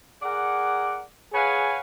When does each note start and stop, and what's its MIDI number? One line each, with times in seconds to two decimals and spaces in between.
0.22 1.03 68
0.22 1.03 70
0.22 1.03 74
0.22 1.03 78
1.33 1.80 68
1.33 1.80 71
1.33 1.80 73
1.33 1.80 77
1.33 1.80 78
1.33 1.80 80